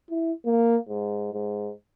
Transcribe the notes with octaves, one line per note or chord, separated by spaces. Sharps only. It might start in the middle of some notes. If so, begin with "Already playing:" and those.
E4
A#3
G#2
G#2